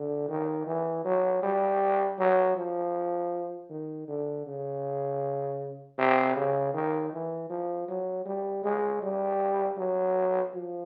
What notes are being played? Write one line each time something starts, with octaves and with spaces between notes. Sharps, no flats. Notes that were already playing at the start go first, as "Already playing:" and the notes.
Already playing: D3
D#3
E3
F#3
G3
F#3
F3
D#3
D3
C#3
C3
C#3
D#3
E3
F3
F#3
G3
G#3
G3
F#3
F3